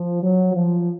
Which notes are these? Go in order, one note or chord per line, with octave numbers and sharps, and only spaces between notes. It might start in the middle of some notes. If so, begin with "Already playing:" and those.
Already playing: F3
F#3
F3